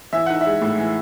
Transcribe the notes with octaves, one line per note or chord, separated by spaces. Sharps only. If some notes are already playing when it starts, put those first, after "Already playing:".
E3 E5
D#4 F#5
G#3 E5
A2
E3